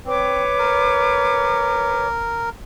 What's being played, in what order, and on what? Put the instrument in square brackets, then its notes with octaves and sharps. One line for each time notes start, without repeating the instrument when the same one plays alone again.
[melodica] C4 [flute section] B4 C#5 D6
[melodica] A#4